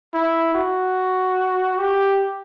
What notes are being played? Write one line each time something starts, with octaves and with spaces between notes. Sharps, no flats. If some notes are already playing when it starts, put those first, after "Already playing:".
E4
F#4
G4